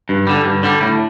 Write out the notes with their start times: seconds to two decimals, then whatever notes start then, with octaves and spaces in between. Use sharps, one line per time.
0.09 G2
0.27 D3 G3
0.45 G2
0.63 D3 G3
0.81 A2